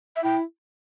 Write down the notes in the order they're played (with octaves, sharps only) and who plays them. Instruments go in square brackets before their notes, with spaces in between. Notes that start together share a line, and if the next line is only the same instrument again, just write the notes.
[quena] E5
[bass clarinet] E4 [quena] G5